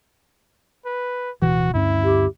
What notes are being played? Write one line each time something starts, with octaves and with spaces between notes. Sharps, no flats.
B4
D1 B2 E3 F#4
D2 G2 C#4 E4
G4